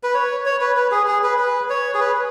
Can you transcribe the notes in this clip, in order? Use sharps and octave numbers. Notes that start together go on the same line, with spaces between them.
B4
C#5
C#5
B4
B4
G#4
G#4
B4
B4
C#5
G#4
B4